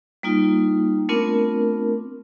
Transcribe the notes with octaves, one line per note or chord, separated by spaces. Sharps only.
G3 A#3 D#4 F4
A3 B3 C4 D4 F4 A#4